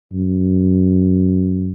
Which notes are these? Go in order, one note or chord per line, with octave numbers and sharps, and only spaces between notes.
F#2